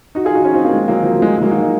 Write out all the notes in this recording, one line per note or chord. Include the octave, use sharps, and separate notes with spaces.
D#4 F#4
F4 G#4
D#4 F#4
C#4 F4
C4 D#4
A#3 C#4
G#3 C4
F#3 A#3
F3
F#3
F3 G#3
G#3
F#3 A#3
D#4 F#4